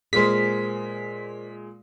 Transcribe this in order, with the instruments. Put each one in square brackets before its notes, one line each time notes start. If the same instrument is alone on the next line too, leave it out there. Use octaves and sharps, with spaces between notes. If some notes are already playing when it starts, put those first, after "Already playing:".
[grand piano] A#2 G#3 [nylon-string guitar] G#4 A#4 C5 [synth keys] B6